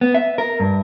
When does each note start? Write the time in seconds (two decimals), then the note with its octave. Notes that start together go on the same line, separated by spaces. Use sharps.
0.01 B3
0.14 E5
0.38 A#4
0.60 G2